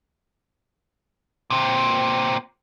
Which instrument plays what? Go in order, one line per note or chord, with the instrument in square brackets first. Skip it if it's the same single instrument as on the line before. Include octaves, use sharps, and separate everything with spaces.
[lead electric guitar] A#2 C4